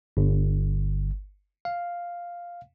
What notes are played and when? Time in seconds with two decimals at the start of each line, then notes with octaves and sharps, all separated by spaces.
0.17 G1
1.65 F5